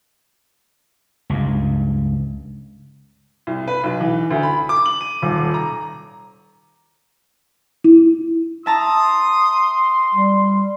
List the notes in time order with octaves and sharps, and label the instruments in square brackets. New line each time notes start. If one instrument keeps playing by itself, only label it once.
[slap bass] C#2 G2
[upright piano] C2
B4
B1
E3
D2
B5
D6
F#7
D#7
D#1
A#5
[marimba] E4
[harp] E5 A5 A#5 [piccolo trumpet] C6 [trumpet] D#6
[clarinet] G3